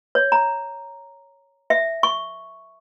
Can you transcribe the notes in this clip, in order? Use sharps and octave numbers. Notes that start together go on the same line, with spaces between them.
C#5
A#5
E5
C#6